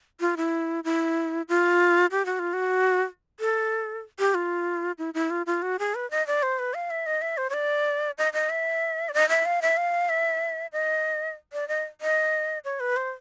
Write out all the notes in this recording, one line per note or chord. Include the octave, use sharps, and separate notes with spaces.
F4
E4
E4
F4
G4
F#4
F4
F#4
A4
G4
F4
E4
E4
F4
F4
F#4
G#4
B4
D#5
D5
C5
B4
F5
E5
D#5
E5
C5
C#5
D5
D#5
D#5
E5
D5
D#5
E5
F5
E5
F5
E5
D#5
D5
D#5
D#5
C#5
B4
C5